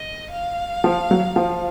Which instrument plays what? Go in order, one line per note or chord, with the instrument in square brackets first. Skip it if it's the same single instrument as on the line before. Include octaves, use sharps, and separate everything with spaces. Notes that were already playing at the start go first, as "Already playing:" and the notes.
Already playing: [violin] D#5
F5
[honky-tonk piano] F3
F#3
F3